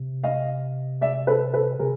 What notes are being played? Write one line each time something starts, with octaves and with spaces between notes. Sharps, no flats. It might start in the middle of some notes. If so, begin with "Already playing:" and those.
Already playing: C3
D#5 F5
D5 E5
A4 B4
A4 B4
C3 G#4 A#4